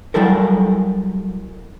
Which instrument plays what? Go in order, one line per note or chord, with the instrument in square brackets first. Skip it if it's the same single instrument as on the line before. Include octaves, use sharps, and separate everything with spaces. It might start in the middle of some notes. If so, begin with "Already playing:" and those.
[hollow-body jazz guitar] F#3 G3 E4 A4 A#4